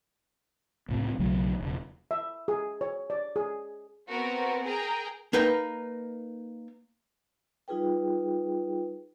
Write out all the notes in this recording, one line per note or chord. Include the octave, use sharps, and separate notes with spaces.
C#2 A2 C3
B1 C#3 F#3 A3
E1 C#3
E5
G#4
C#5
D5
G#4
B3 C4 F#4 A#4
G#4 A#4 G5 A#5
A#3 D#4 A#4 B4 G5
G3 D#4 F4 G#4 B4 G5